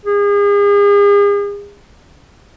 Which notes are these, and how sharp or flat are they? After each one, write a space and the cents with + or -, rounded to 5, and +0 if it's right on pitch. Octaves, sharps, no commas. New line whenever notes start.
G#4 -40